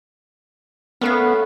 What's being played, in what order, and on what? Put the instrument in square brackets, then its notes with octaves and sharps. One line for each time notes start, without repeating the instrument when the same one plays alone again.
[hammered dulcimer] A3 C#4 [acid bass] B3 [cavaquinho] A#4 B4 F5